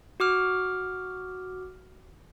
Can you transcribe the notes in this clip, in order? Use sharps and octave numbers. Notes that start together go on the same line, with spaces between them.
F#4 D6 F6